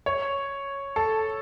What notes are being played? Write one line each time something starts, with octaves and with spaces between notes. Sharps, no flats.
C#5
A4